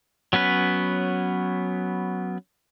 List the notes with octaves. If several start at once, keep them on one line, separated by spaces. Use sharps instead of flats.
F#3 B3 C#4 B4